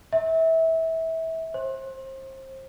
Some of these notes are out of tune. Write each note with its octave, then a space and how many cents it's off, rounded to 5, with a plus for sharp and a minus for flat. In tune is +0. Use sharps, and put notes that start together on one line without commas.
E5 -25
C5 +30